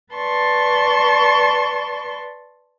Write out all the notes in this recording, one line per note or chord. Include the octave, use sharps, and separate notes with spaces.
B4 D5 A5 C6 C#6